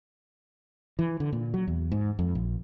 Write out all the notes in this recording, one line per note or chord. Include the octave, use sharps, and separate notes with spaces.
E3
D3
A#2
F#3
E2
G#2
F2
A#1